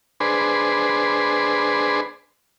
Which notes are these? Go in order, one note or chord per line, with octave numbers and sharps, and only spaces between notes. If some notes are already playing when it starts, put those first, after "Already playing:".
D4 G#4 B4 C5